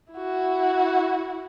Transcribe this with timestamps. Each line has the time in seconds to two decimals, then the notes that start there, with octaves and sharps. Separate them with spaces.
0.13 E4 F#4